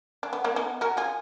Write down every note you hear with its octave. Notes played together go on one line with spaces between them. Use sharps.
D4
B3
A#3 D4
B3 D#4
F#4 A#4
F4 G#4